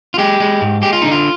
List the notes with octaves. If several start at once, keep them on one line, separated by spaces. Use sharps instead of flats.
F4
G#3 G4
G#3
G#2
G#3 G4
F4
D3 D#4
F4